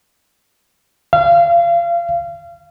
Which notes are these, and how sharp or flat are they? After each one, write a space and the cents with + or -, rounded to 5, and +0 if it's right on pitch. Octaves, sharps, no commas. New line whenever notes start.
F5 -30